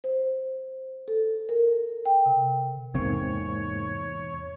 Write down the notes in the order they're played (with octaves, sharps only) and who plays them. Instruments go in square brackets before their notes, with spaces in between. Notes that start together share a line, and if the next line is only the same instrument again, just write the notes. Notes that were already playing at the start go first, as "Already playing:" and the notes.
[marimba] C5
A4
A#4
G5
C3
[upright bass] E2 [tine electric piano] G#2 A#3 [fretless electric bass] C3 C4 [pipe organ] C#5